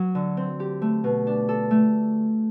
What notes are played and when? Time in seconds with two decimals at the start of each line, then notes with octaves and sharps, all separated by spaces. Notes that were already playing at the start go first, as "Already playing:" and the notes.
Already playing: F#3
0.15 D3
0.37 C4
0.60 G4
0.82 A3
1.04 B2
1.27 D4
1.49 A4
1.71 A3